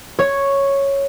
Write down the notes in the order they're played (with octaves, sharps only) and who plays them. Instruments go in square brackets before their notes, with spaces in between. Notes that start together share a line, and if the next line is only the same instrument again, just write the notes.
[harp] C#5